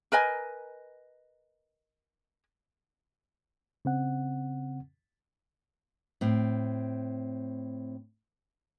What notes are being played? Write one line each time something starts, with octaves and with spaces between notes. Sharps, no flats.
A#4 B4 D#5 G#5
C#3 C4 F#5
A2 C4